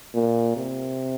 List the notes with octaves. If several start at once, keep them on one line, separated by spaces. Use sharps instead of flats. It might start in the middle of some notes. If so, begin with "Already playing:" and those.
A#2
C3